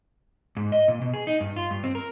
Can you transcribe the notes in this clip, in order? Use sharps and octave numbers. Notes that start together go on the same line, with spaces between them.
G#2
D#5
A#2
B2
G#4
D#4
G2
F4
G2
C4
A#4